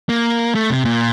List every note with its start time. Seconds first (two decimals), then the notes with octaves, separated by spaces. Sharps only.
0.09 A#3
0.55 A3
0.70 C3
0.85 A#2